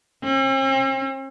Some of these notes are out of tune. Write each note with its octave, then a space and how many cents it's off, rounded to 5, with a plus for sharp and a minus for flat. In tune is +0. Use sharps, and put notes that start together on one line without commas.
C4 +45